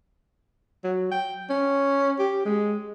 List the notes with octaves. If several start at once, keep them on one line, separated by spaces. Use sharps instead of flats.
F#3
G5
C#4
G4
G#3